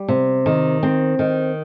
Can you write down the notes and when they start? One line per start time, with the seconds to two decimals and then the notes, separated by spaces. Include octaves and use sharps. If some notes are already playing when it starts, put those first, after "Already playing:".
Already playing: G3
0.08 C3
0.46 D#3
0.83 C4
1.19 D#3